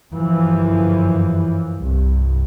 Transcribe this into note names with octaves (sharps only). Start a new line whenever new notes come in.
G1 F#2 E3 F3
C2 G2